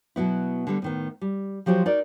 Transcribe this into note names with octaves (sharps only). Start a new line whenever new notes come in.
B2 F#3 B3 E4
D3 G3 B3
A2 D#3 B3
G3
F3 F#3 G4 A4 C5
D#4 F#4 A#4 D5